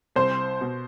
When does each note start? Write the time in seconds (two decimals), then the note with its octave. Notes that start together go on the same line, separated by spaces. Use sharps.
0.16 C2 C5
0.61 B2